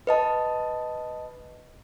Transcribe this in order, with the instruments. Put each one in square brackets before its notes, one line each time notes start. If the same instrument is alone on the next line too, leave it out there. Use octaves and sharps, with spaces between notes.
[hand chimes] B4 D#5 A5